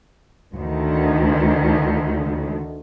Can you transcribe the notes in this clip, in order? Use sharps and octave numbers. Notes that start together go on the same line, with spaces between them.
D2 D3 D#3